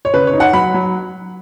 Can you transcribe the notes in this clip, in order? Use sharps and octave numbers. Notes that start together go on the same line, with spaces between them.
C#5
C#3 B4
C#5
D#4
F#5
F#3 B5
F#3